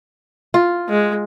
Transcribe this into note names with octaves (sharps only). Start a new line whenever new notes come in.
F4
G#3